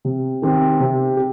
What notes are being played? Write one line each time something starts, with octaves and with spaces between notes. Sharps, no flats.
C3
D#3 C4 G4
C3
G4